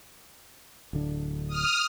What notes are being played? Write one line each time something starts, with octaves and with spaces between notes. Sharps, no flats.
D1 D3 D4
D#6 F6